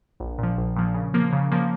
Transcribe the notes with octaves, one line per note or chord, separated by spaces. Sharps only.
A#1
A#2
F3
A#1
A#2 F3
C#3
F3 A#3
C#3
F3 A#3